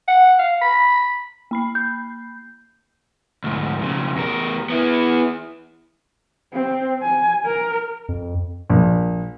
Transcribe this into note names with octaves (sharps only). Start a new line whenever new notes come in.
F#5
F5
B5
A#3 B5 C7
G6
D2 G#2
F2 C#3
E2 A#4
B3 E4
C4
G#5
A#4
F2
A#1